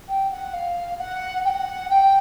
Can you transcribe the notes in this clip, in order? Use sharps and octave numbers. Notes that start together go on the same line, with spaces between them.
G5
F#5
F5
F#5
G5
F#5
G5